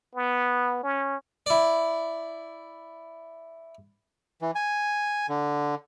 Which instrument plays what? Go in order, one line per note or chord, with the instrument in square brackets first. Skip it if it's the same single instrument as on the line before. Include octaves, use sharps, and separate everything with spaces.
[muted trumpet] B3
C#4
[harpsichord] E4 D5
[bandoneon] E3
G#5
D3